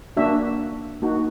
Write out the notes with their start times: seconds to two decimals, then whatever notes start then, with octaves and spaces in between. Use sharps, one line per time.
0.17 A#3 D4 F#4 E5
1.02 A#3 D#4 F#4